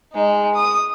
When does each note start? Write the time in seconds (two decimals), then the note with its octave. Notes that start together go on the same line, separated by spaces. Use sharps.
0.13 G#3 D#4
0.54 D#6